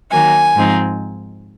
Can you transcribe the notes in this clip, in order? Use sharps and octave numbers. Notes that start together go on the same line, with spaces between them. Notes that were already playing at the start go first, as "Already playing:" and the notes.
D#3 F#3 A#3 G#5
G#2 F3 C4 D#4